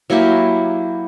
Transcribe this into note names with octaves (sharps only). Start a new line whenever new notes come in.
F#3 A#3 E4 G4